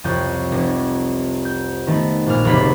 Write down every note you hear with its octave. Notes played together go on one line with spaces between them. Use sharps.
C2 F2 C#4 G6
F1
G6
D#3 A3 B3
A#1 A#2 F6
F1 C#2 F#2 B5 C6 B6